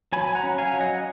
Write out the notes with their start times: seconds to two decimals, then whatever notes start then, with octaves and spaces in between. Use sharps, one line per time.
0.13 F#3 G#5 B5
0.35 F#5 A#5
0.43 C#4
0.58 F5 G#5
0.73 F#3
0.80 D#5 F#5